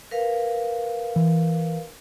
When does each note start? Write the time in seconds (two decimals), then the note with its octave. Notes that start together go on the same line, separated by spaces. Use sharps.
0.11 A#4 B4 F5
1.16 E3